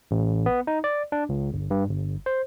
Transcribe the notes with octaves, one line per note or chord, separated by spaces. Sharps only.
A1
B3
D#4
D5
D4
C#2
G1
G2
G1
C5